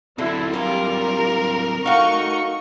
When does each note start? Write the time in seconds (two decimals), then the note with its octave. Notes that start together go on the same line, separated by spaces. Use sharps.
0.18 D3 F#3 C4 E4
0.54 G3 A#3 F4 A#4
1.86 A3 D#4 F#4 F5 C#6